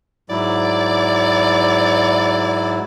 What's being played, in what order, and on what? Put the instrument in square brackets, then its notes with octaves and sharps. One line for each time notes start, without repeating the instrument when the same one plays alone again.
[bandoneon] G#2 F#3 E4 [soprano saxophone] D5